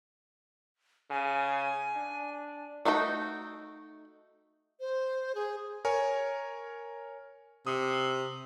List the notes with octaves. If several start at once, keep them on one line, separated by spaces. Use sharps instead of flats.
C#3 G#5
D4
A3 D#4 F#4 C5 G5
C5
G#4
A#4 C#5 G#5
C3 D#6